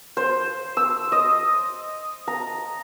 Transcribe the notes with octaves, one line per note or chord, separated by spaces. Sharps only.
C5
E6
D#5
A#5